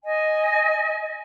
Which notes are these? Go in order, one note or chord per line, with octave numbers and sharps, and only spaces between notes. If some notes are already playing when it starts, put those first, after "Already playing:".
D#5 G#5